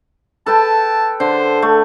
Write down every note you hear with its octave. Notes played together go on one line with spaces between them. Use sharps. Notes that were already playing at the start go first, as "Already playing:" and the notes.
A4 B4 G5 A5
D3 C5
A3